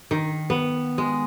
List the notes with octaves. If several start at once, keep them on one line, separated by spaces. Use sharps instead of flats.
D#3
B3
G#3